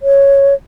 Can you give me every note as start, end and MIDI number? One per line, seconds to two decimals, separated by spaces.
0.01 0.54 73